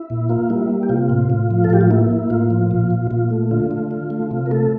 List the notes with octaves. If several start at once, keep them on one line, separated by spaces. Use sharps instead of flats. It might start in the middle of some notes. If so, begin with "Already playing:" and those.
Already playing: E4
A#2
A#3 F4
G3 E4
A#3
G4
C3 F4
A2
A2
F3
A4
A2 G4
F4
A#3 E4
A#3
A2 F4
F3
A#2
A#2
A#2 F4
A3
D3 F4
A3
D3
A3
C3 F4
A#4
A3 A4